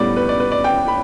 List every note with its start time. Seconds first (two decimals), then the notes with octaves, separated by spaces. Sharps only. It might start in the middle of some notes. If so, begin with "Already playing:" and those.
Already playing: A2 G3 B3 D5
0.16 B4
0.29 D5
0.40 B4
0.52 D5
0.64 G5
0.88 B5